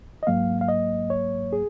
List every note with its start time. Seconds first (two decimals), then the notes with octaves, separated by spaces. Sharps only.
0.23 D#5
0.27 G#2 F#3 A#3 F5
0.61 F5
0.68 D#5
1.10 C#5
1.53 G#4